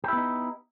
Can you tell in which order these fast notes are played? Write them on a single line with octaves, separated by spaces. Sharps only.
G4 E4 B3 D#4